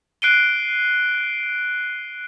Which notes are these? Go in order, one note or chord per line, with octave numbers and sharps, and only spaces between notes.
F#6 C7 D7 D#7 G7